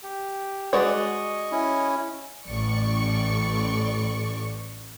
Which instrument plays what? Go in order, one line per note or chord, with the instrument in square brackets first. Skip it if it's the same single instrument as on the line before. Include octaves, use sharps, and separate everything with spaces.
[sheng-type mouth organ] G4
[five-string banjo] G#3 F#4 D5 [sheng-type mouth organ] D#5 C#6
[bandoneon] C#4 E4
[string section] A1 D5 C#6